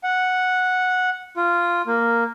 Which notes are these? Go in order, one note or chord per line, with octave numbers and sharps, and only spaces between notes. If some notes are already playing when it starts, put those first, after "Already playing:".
F#5
F4
A#3